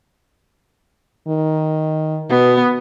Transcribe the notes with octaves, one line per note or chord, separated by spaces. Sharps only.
D#3
B2 B3